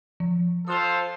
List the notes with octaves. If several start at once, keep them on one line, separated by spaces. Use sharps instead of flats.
F3
F4 A4 C5 D#6 F#6 F7